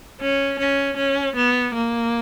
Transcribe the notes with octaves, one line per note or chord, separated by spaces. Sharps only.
C#4
C#4
C#4
B3
A#3